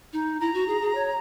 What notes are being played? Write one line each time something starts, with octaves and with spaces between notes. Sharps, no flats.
D#4
E4 A#5
F#4
G#4
G#4
C#5